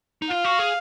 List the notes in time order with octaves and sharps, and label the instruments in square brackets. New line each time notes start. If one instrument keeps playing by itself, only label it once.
[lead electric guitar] D#4
[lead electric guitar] F4 [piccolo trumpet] F5
[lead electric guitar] F#4
G#4